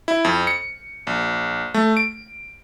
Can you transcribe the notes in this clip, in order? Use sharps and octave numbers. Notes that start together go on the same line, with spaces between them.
E4
F2
C#7
A#1
A3
D7